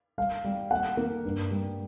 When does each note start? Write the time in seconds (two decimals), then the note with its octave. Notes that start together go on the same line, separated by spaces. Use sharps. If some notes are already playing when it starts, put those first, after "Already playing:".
0.18 G3 F5
0.44 G3
0.71 A#3 F#5
0.97 A#3
1.25 G2
1.51 G3